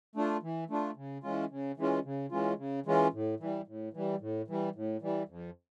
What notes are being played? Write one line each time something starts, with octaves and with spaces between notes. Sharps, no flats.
A3 D4 F4
E3
A3 D4 F4
C#3
E3 G#3 C#4 F4
C#3
E3 G#3 C#4 F4
C#3
E3 G#3 C#4 F4
C#3
E3 G#3 C#4 F4
A2
E3 G3
A2
E3 G3
A2
E3 G3
A2
E3 G3
F2